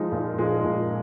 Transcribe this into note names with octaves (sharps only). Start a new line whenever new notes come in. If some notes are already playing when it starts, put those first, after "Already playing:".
Already playing: F3 G#3 D#4
A#2
F3 G#3 D#4
A#2